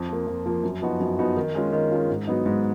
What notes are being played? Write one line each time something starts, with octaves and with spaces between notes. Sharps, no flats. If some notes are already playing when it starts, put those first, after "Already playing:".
Already playing: F2
F3 A#3
F2
F3 A#3
F#2
F3 B3 D#4 F#4
F#2
F3 B3 D#4 F#4
D#3
G#3 C#4 F4
D#3
G#3 C#4 F4
G#2
F#3 B3 D#4
G#2